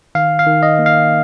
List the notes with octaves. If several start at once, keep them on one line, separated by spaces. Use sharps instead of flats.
D#3 F5
F5
D#3
D#5
A#3
F5